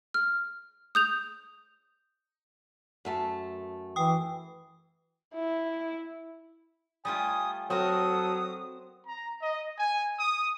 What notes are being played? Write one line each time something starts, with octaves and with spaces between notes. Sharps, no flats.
F6
D#6 G6 F7
F#2 A3 A5
E3 G5 D#6
E4
G3 A3 F4 G#5 D#6
F#3 C4 F#4 A4 A#4 D#6
A#5
D#5
G#5
D#6